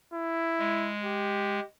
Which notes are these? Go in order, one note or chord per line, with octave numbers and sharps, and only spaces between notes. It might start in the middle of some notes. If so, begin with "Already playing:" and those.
E4
G#3
G4